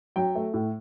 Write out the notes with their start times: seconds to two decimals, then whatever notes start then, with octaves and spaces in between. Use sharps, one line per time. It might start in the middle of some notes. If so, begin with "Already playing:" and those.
0.16 F#3 G5
0.35 A3
0.54 A2